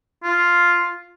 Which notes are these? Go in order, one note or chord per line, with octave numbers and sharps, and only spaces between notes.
F4